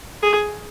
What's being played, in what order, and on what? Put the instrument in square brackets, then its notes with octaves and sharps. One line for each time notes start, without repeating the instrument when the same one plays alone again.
[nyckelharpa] G#4